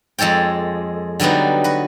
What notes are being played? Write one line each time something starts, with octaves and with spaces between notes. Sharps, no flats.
F2 G#3 A4 C#5 G5
D3 F#3 G3 B3 D#4
F#4 B4